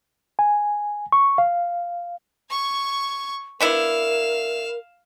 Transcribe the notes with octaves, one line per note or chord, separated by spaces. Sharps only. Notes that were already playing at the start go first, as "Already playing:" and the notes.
G#5
C#6
F5
C#6 G#6
B3 D4 E4 A#4 F5 E7